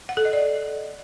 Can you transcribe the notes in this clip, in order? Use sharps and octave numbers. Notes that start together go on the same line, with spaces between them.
F#5
A4
D#5
D5